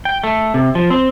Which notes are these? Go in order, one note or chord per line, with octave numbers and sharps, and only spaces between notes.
G5
A3
C3
F3
C4